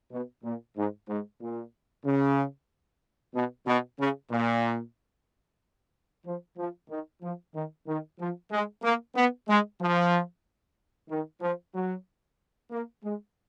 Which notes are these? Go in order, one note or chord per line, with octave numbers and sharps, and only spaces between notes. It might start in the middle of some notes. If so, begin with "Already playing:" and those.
B2
A#2
G#2
G#2
A#2
C#3
B2
B2
C#3
A#2
F3
F3
D#3
F3
D#3
D#3
F3
G#3
A#3
B3
G#3
F3
D#3
F3
F#3
A#3
G#3